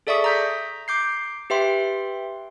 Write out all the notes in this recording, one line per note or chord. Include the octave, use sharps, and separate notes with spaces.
G#4 A4 D5 E5 C#6 D#6
A#5 G6 B6
D6 G6 C7
G4 B4 E5 G5 C6